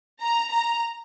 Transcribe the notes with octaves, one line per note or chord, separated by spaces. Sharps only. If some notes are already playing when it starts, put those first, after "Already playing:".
A#5
A#5